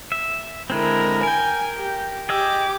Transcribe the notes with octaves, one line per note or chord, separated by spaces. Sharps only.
E5
D3 G#3 C4 E4 A#4
A#4 G5 G#5
G4
G4 G#4 D#5 D6 E6